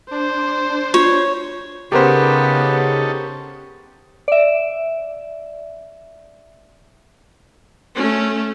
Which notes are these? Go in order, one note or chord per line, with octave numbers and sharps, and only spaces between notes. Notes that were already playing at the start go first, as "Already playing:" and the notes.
D4 C5
F4 C#5
C#3 B3 C#4 D#4 G4 A4 A#4 C5
D5 E5
A3 C#4